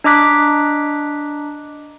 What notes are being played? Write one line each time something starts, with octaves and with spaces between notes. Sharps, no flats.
D4 D#5 A#5 D6 F#6 B6